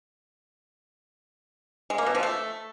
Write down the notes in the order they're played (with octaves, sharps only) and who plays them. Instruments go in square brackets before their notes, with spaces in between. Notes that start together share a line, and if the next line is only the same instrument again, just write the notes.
[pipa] G#3
A#3
B2
F3
A3